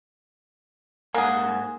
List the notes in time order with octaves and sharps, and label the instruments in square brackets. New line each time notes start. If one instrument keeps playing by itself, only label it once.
[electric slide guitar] G#2 F#5 G#5 [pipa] A#3 G#4